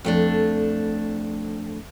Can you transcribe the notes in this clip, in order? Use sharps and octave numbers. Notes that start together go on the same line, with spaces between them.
F2 A3 D4